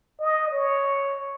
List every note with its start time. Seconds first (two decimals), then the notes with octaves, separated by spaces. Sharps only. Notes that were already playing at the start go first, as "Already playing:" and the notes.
0.21 D#5
0.52 C#5